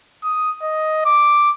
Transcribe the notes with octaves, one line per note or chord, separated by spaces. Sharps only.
D#6
D#5
D6